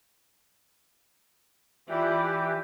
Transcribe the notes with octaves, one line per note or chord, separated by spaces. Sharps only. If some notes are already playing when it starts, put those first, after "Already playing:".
E3 E4 F4 G4 D5